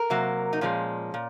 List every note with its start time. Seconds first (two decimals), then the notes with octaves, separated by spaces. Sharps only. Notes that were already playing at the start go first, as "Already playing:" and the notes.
Already playing: A#4
0.10 C3 F#3 A#3
0.53 D#4
0.61 A#2 F3 G#3 C#4
1.14 A#2